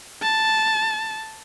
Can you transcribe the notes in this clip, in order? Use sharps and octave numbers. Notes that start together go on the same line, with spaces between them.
A5